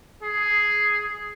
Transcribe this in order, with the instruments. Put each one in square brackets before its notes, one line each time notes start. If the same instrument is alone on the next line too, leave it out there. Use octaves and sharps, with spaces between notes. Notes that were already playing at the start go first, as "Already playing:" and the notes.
[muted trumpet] G#4